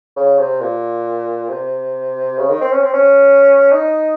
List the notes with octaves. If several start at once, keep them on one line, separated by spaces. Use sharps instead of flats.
C#3
C3
A#2
C3
C#3
D#3
C4
C#4
C4
C#4
D#4